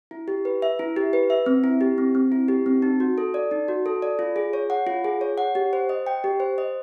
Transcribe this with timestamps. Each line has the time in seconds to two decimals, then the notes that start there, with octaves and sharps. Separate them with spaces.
0.11 E4
0.28 G4
0.45 B4
0.62 E5
0.79 E4
0.96 G4
1.13 B4
1.30 E5
1.46 C4
1.64 E4
1.81 G4
1.98 C4
2.15 C4
2.32 E4
2.48 G4
2.66 C4
2.82 D#4
3.00 F#4
3.18 A4
3.34 D5
3.51 D#4
3.68 F#4
3.86 A4
4.02 D5
4.19 F4
4.36 G#4
4.53 C#5
4.70 F#5
4.87 F4
5.04 G#4
5.21 C#5
5.38 F#5
5.55 G4
5.73 C5
5.89 D#5
6.07 G5
6.24 G4
6.40 C5
6.58 D#5